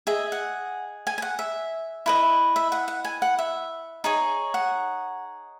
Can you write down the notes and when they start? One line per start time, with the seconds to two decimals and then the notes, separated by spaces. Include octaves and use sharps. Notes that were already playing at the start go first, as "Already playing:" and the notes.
0.07 G#4 D#5 E5
0.32 F#5
1.07 G#5
1.18 G#5
1.22 F#5
1.39 E5
2.06 E4 B4 D#5
2.56 E5
2.72 F#5
2.88 F#5
3.05 G#5
3.22 F#5
3.39 E5
4.04 D#4 G#4 C#5
4.54 F#5